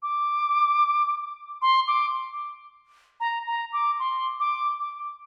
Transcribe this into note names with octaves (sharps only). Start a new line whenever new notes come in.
D6
C6
D6
A#5
A#5
D6
C6
D6
D6